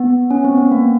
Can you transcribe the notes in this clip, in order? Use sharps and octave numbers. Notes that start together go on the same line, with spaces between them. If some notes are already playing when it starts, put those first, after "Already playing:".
Already playing: B3
C#4
C4
B3
A#3